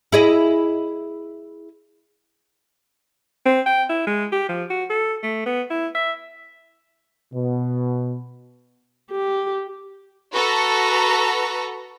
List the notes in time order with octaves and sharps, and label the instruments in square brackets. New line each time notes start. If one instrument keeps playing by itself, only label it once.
[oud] E4 G#4 D#5
[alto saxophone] C4
G5
E4
G#3
G4
F3
F#4
A4
A3
B3
E4
E5
[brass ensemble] B2
[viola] G4
[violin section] F#4 A4 B4 A#5